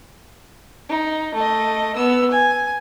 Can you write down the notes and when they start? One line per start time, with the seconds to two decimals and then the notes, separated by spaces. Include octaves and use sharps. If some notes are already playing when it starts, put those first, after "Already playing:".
0.89 D#4
1.34 A3 D#5
1.96 B3 E6
2.31 G#5